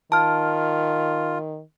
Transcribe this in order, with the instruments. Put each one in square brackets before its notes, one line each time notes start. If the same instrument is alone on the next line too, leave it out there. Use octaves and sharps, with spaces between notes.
[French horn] D#3 [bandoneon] F4 [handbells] A5 F6